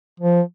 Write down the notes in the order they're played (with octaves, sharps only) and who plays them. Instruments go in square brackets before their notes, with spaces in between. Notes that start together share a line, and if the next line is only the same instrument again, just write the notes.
[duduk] F3